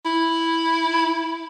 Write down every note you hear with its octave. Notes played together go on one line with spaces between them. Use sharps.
E4